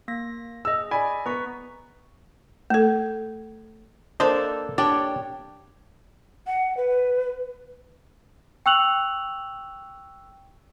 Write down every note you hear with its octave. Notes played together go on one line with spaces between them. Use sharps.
A#3 A#6
G#4 D#5 E6
D5 G#5 B5
B3 A#5 C#6 B6
A3 A4
A#3 D4 A4 C5 D#5
D4 G4 C#5 D5 G5
F#5
B4
G5 C#6 E6 F#6 F7 F#7